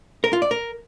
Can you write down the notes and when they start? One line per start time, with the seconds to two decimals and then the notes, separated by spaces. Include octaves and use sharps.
0.24 A#4
0.33 F4
0.42 D5
0.51 A#4